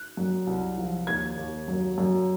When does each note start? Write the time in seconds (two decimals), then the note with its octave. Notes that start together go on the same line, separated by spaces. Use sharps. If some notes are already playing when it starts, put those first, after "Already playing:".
Already playing: F#6
0.17 F#2
0.47 C2
0.78 F3
1.07 D#2 G#6
1.37 D#2
1.68 F#2
1.98 F#2